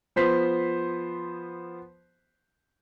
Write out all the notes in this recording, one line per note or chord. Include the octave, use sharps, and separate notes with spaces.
F3 B3 C5 C6 B6